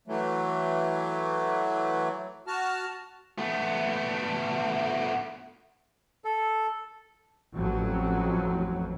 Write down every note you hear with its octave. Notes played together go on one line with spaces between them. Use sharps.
E3 F#3 A3
F#4 A5 F6
A3 B3
A4
A1 F2 F#3